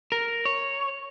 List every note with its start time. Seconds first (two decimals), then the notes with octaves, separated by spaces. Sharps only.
0.12 A#4
0.45 C#5